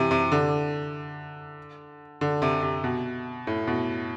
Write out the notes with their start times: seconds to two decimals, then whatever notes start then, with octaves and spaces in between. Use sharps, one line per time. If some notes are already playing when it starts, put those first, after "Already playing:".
Already playing: C3 E3
0.11 C3
0.32 D3
2.21 D3
2.42 C3
2.62 C3
2.84 B2
3.47 A2
3.68 B2